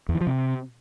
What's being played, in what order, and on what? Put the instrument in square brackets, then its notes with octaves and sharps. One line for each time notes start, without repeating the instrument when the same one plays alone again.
[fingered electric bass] E2
E3
F3
C3